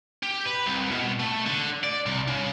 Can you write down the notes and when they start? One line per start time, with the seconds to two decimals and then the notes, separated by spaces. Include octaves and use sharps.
0.23 G4
0.45 B4
0.66 C2
0.91 B2
1.20 A3
1.46 D3
1.84 D5
2.06 C2
2.28 C#3